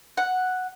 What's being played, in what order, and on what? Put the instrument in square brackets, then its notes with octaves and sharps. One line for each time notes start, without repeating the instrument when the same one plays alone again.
[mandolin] F#5